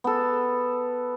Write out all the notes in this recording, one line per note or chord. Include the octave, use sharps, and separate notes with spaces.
B3 A4